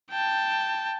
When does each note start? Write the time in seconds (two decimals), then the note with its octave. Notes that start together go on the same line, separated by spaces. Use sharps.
0.11 G5 A5